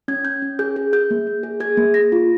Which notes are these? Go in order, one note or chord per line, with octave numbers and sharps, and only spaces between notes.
C#4 G#6
C#4 G6
C#4
G#4 G6
G#4
G#4 G6
A#3
A#3
G#4
G#4 G#6
A#3
A#3 A#6
F4